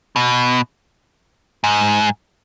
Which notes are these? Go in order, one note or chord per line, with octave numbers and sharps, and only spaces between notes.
B2
G#2